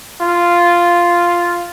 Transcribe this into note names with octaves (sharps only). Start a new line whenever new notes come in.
F4